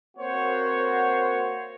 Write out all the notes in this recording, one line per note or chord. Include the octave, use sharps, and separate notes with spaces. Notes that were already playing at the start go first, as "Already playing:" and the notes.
A#3 C4 F#4 C5 C#5